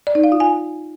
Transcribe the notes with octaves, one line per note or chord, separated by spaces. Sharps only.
D5
D#4
F5
F4
G#5